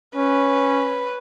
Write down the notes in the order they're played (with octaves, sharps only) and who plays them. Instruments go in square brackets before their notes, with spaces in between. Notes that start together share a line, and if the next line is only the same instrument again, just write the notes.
[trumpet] C#4 [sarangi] B4